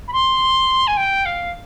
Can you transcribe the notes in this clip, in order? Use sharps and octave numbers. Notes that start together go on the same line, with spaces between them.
B5
C6
G#5
G5
F5